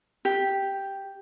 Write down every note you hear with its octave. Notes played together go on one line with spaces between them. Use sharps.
G4